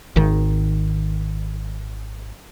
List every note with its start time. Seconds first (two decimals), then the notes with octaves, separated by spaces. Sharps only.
0.16 G#1 D#3